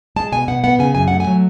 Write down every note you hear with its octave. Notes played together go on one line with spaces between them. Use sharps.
G#3 A5
B2 G#5
B2 F#5
B3 F#5
C#3 G#5
F#2 G#5
A3 F#5
G#5
F#3